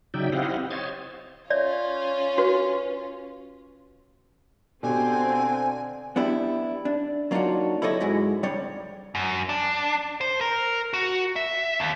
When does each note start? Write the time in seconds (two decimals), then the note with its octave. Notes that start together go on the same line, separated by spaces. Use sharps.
0.14 C#3 F#3 D#4 D5 E5 G5
0.32 C4 E4 G4 D#5 F5 F#5
0.70 C5 C#5 D#5 G#6 A6
1.50 C#4 F4 C#5 D5 E5
2.38 F#4 B4
4.83 B2 D3 C4 G4 G#5
6.16 B3 D4 E4 G4
6.85 D4
7.31 F#3 A#3 D4 D#4 F4 F#4
7.82 E4 G4 A4 C#5 D#5
8.00 G#2 G#3 E4 F#4
8.43 C2 G3 D4 C#5
9.15 F#2
9.49 D4
10.21 C5
10.41 A#4
10.93 F#4
11.36 E5
11.80 D#2